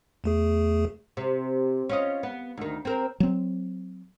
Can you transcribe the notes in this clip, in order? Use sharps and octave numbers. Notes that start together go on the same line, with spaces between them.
E2 A3 G#4
C3
C#4 F4 D#5
B3
D2 D#3
C4 A#4
F#3 C4